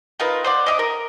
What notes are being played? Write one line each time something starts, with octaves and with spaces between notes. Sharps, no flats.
D#4 F4 A#4 B4
C5 D5 F#5
D#5 E5 D6
A#4